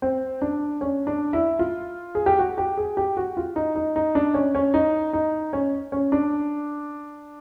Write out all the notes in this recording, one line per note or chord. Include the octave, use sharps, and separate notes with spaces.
C4
D4
C#4
D4
E4
F4
G#4
G4
F#4
G4
G#4
G4
F#4
F4
D#4
D#4
D#4
D4
C#4
C#4
D#4
D#4
C#4
C#4
D4